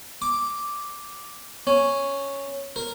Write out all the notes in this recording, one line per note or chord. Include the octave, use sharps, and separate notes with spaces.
D6
C#4
A#4